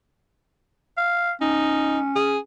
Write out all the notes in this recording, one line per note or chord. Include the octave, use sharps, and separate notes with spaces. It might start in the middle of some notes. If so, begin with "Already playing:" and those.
F5
C#4 D#4
G#4